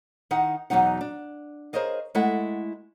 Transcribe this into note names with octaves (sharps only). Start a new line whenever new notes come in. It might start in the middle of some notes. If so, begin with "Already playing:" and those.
D#3 D#4 E4 F#5
E2 B2 F#3 B3 D#4 F#5
D4
G#4 A#4 C5 C#5 D#5 F5
G#3 A3 E4 A4 F#5